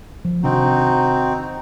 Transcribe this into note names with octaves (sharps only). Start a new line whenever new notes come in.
F3
C3 D#3 C4 D4 D#4 F#4